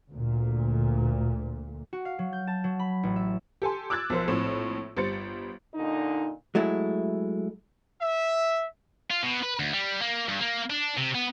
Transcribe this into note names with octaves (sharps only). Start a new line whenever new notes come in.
D2 A#2
F#4
F5
F#3
G6
A5
F#3
B5
A1
E5
G4 A4 G#5 C6
D6 E6 F#6 G#6 A6
B1 F3 A#4 C5
A#1 A2 C4 E7
G1 G3 C5 A6 C#7
A#2 D3 D#4
F#3 G#3 A3 E4
E5
F4
B2
B4
D2
G3
A#3
G2
A#3
D4
C3
B3